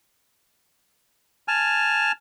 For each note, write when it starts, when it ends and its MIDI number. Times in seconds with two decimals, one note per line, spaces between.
1.48 2.12 80
1.48 2.12 81
1.48 2.12 89